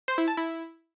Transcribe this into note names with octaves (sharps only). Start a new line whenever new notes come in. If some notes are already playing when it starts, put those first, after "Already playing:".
C5
E4
A5
E4